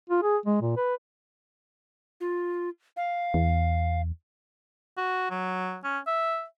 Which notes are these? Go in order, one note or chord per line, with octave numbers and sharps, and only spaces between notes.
F4
G#4
G#3
A#2
B4
F4
F5
E2
F#4
F#3
C#4
E5